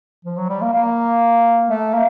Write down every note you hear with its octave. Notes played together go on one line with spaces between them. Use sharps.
F3
F#3
G3
A#3
A#3
A3
A#3